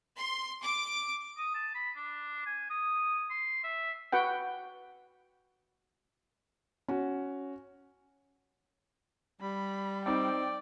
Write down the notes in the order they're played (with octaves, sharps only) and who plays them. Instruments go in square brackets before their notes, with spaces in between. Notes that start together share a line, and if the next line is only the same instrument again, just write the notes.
[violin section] C6
D6
[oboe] D#6
A5
B5
D4
G#5
D#6
C6
E5
[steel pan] F#4 B4 F#5 G5
[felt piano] C#4 F#4
[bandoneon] G3 [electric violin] B5
[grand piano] C4 D#4 [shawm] D5 [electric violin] G5